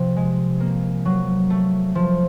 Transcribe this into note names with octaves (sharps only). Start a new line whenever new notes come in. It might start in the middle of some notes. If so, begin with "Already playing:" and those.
Already playing: C3 F3
G#3
A#3
F#3
A3
F3